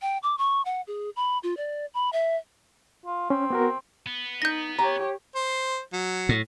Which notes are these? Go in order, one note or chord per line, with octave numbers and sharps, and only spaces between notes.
G5
D6
C#6
F#5
G#4
B5
F4
D5
B5
E5
F4
C4 C#4
B3 F#4 A#4
B3
D#4 G6 A#6
G4 C#5 A#5
C5
F#3
A2